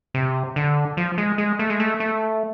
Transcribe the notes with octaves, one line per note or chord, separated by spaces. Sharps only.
C3
D3
F3
G#3
G#3
A3
G#3
A3
A3